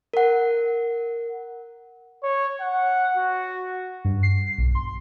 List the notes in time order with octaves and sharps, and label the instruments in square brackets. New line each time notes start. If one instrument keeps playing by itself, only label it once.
[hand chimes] A#4 F#5
[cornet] C#5
F#5
F#4
[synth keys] G2
C7
B1
C6